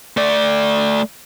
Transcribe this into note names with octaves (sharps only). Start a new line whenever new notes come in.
A3 D5